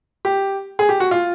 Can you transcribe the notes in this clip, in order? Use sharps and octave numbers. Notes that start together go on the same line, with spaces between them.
G4
G#4
G4
F#4
F4